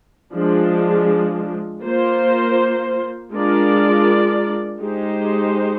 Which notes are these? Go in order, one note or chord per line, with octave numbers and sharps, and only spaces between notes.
F3 G#3 D4
A#3 F4 C5
G#3 D4 F4 A#4 D5
G#3 D#4 G4 C5